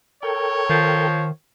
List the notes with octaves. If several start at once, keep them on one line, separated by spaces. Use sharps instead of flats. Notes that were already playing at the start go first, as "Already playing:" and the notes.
A4 A#4 C#5 G5
D#3 F3